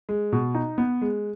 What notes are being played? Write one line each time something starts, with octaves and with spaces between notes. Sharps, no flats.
G#3
B2
D#4
B3
G#3